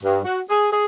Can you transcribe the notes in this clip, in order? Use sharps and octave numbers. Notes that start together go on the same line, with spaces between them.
G2
F#4
G#4
G#4